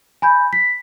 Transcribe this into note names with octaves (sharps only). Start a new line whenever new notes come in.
G#5 B5 G6
B6